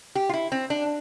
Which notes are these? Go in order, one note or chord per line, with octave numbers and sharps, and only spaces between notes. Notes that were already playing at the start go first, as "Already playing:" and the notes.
G4
F4
E4
C4
D4